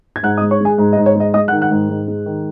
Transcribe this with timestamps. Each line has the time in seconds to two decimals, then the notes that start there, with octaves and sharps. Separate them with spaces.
0.16 G#6
0.23 G#2 F#5 F#6
0.38 D#5 D#6
0.42 G#3
0.51 C#5 C#6
0.61 G#3 G#4 G#5
0.78 G#2
0.93 D#5
0.97 G#2
1.06 C#5
1.16 G#3 D#5
1.34 G#3 D#5 D#6
1.48 F#5 F#6
1.52 D#3
1.62 F#5 F#6
1.71 G#2
1.89 G#2
2.08 G#3
2.26 D#3